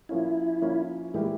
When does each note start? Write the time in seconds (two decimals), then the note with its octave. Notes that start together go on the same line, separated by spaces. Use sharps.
0.09 F3 A#3 C#4 E4 F4
0.62 F3 A#3 C#4 F4
1.14 E3 G3 G#3 A#3 E4 G4